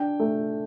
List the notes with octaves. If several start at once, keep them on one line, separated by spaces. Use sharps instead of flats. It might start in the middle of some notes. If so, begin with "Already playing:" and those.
Already playing: D4 G5
A3